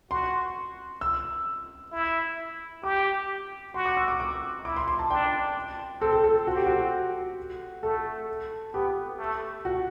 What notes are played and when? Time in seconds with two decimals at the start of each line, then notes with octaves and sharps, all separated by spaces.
0.11 F#4 C6
1.01 E6
1.92 E4
2.84 G4 D6
3.74 F#4 C6
3.85 D6
3.97 E6
4.08 D6
4.20 D6
4.65 E4 D6
4.76 C6
4.88 C6
4.99 A5
5.10 D4 G5
6.01 C4 A4
6.12 A4
6.24 A4
6.47 C4 F#4
6.56 G4
6.66 F#4
7.83 A3 A4
8.74 B3 G4
9.19 A3
9.65 F#4